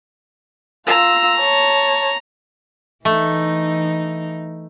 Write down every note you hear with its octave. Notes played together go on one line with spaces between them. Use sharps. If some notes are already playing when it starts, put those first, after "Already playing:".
F4 A#5 E6
C#5 A5
E3 A3 D#4